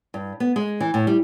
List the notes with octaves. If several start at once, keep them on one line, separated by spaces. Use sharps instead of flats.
G2
B3
G#3
E3
A2
G3